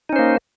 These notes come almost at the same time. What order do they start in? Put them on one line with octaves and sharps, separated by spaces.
D#4 C#4 C5 A#3